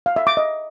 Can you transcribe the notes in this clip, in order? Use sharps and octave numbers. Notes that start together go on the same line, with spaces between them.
F5
E5
D6
D#5